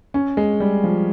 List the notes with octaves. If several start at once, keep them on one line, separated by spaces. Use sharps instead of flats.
C#4
G#3
G3
F3